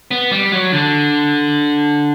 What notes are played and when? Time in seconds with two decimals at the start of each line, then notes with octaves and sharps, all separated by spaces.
0.11 B3
0.31 G3
0.52 F#3
0.73 D3